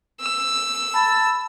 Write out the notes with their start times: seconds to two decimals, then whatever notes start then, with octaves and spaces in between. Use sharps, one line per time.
0.21 E6
0.94 A5 B5